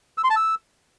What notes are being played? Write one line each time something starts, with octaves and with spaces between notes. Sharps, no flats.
E6
C6
A5
E6